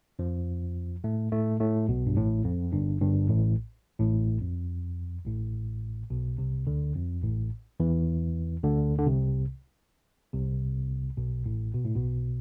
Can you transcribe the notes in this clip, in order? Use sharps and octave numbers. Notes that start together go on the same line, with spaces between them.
F2 F3
A2 A3
A2 A3
A2 A3
B1 B2
G2
A1 A2
F2
G1 G2
G1 G2
A1 A2
A1 A2
F2
A1 A2
B1 B2
C2 C3
D2 D3
F2
A1 A2
E2 E3
D2 D3
D3
C2 C3
C2 C3
B1 B2
A1 A2
B2
A2
B1 B2